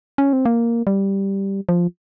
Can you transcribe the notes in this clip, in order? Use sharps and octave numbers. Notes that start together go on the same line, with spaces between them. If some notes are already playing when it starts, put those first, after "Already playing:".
C#4
C4
A#3
G3
F3